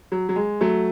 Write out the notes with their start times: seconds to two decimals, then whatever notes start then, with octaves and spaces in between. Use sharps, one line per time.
0.12 F#3
0.29 F#3
0.36 G#3
0.61 F#3 A3